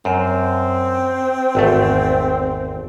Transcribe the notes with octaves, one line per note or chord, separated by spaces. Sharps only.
F#2 C4
G#1 E2 A3